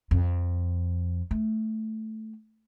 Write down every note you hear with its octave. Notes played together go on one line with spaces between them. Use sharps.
F2
A3